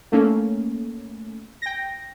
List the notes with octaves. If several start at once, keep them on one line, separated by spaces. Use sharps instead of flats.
A3 A#3 C#4
G5 A#6